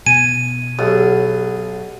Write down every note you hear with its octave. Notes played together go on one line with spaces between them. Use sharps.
B2 G#5 D#7
B1 G4 G#4 F#5